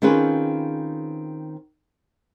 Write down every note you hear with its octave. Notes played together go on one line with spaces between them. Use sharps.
D#3 C4 C#4 F4 G#4 B4